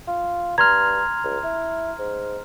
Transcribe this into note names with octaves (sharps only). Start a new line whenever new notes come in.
F4
G2 A#5 C6 F6 G#6
C#2
E4
G#2